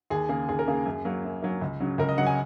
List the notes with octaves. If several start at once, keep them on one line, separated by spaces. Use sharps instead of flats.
D#2 G#4
C#3 A#3 G#4
D#2 G#4
A#4
C#3 A#3 G#4
F#2
F#3 A#3
F#2
F#3 A#3
C#2
C#3 F#3
C#2 A#4
D#5
C#3 F#3 F#5
G#5